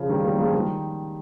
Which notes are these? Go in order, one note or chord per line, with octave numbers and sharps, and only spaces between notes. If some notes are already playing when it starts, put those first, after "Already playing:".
Already playing: C#3 F3
D#3 G3
G3 A#3
F3 G#3
D#3 G3